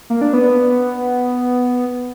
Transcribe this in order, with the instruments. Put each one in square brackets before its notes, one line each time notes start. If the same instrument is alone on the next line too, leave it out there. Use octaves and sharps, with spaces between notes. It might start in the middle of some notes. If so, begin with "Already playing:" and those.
[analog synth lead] A#3
D4
B3